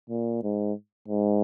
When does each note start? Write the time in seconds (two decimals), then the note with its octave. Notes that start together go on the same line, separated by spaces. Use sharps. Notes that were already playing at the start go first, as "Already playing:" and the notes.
0.09 A#2
0.43 G#2
1.08 G#2